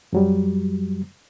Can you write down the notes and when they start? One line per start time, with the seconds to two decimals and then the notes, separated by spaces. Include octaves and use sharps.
0.13 F#2 F#3 G3